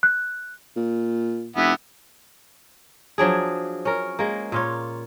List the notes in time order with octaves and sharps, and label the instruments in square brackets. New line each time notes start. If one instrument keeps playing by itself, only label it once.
[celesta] F#6
[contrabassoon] A#2
[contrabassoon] F1 [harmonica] E3 B3
[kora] F3 F#3 D4 G#4
C#4 A#4
G#3 A#3
A#2 F4 C#5